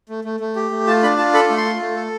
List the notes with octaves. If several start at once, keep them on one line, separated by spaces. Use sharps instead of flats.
A3
A3
A3
G4
A3
F4 A5
D4 B5
F4 A5
A4 B5
A3
C6
F4
A3
A4